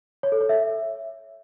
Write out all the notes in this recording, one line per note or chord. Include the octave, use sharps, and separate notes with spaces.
C#5
A4
C#5
E5